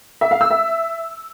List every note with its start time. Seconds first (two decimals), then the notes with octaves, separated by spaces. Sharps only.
0.21 E5
0.31 F5
0.41 E6
0.51 E5